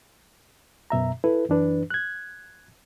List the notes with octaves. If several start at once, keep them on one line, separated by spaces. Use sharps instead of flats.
F#2 B2 E5 A#5
E4 A4 B4
F#2 E3 D4 B4
F#6 G#6